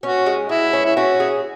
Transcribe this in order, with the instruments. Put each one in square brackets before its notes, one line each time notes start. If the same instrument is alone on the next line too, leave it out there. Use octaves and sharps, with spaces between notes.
[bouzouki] C#4 [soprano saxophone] F#4
[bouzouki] G#3
[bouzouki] G#3 [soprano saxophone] E4
[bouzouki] C#4
[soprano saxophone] E4
[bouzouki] C#4 [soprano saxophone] F#4
[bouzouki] G#4